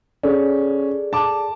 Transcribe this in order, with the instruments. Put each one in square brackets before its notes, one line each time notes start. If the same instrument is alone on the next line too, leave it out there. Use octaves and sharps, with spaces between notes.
[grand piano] C#4 [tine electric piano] G#4 A4 D5
[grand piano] A5 D6